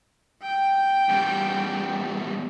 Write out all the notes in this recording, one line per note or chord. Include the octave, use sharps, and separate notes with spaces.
G5
E2 G3